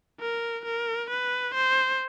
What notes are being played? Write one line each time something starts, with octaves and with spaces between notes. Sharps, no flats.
A#4
A#4
B4
C5